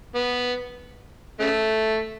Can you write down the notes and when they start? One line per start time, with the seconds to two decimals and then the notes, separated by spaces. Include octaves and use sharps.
0.15 B3
1.40 C#3 A3